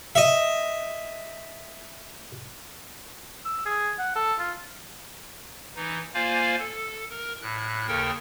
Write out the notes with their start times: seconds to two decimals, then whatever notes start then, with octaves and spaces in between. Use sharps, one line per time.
0.15 D#5 E5
3.45 E6
3.66 G#4
3.99 F#5
4.16 A4
4.39 F4
5.76 E3 D#4
6.14 A#3 F4 C5 D5 F5 G#5
6.59 A4
7.10 A#4
7.42 A2 F#6
7.88 D#2 C#3 A4 A#4 G5